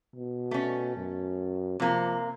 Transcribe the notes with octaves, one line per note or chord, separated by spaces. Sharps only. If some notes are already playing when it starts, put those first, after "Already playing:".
B2
A3 C#4
F#2
C3 F3 A#3